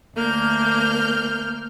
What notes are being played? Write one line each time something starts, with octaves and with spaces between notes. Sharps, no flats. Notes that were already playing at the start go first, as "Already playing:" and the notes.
D2 A#3 F6 G6